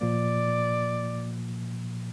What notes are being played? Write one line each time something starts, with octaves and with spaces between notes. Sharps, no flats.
A#2 F3 A#3 D5